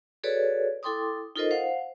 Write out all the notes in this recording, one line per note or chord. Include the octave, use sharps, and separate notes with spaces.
F#4 G#4 A4 B4 C#5 D5
E4 A4 G5 C6 D6 D#6
D#4 F4 A4 A#4 C5 D#5
C5 F5 F#5